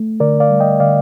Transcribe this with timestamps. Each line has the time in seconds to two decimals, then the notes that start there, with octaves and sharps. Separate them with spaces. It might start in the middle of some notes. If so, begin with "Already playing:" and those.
Already playing: A3
0.20 D3 A#4 D5
0.40 D5 F5
0.50 G3
0.60 D#5 G5
0.80 D3 D5 F5